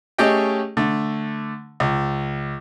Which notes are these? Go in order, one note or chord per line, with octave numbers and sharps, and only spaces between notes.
A3 C#4 G4 G#4 D#5 G5
D3 A3
C#2